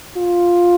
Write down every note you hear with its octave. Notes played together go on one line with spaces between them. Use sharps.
F4